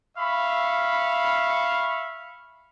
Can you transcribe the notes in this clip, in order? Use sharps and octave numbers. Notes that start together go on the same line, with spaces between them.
E5 F5 B5 C#6